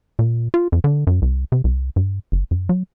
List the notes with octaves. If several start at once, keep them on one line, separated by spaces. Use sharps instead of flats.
A#2
F4
F2
D3
F#2
C2
C3
C2
G2
G1
F#2
F#3